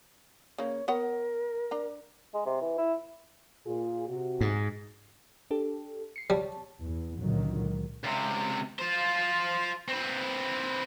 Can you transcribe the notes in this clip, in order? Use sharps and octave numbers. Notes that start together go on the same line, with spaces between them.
C#3 A#3 C#5
B3 A#4 C#5 F#5
D4 A#5
G#3
C3
E3
E4
A#2 F4 G#4
C3 F#4
G#2
D4 G4 A4
C7 C#7
G3 C#5 A5
E2
C#2 A#2 D3 D#3 F#3
C#2 C3
F4 C5
C4 B4